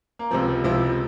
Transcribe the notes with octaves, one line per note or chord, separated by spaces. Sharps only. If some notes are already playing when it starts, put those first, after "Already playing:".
A#3
C#2 C3 F3 C4
C#2 C3 F3 E4